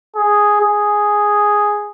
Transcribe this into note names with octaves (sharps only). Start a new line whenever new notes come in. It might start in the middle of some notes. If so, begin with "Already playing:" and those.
G#4
G#4